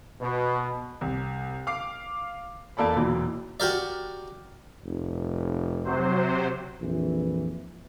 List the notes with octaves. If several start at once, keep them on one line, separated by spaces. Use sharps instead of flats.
B2
C2
F5 D6 C7
E2 A#3 A4 D5 B5
E1 A#2 E3 F#3
F#4 G4 A#4 D5
F1
C3 F#3 C5
A#1 F2 E3